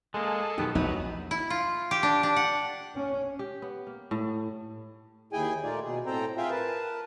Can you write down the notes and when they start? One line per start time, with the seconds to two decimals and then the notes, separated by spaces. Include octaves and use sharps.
0.14 G#3 A#3 G#4 A4
0.58 B1 D#3 B3 G4
0.75 A#1 E2 F#3 B3 D#4
1.31 E4
1.50 F4
1.91 G4
2.03 D4
2.23 D4
2.36 F#5
2.95 C#4
3.39 G4
3.62 B3
3.87 A#3
4.11 A2
5.33 D#2 E4 G#4 G5 G#5
5.64 A#2 A3 D#4 F4 D5
5.83 B2 G#4
6.06 A2 C4 A4 C5 G5 A#5
6.37 F4 G#4 E5 F5 G5
6.50 A#4 B4 A5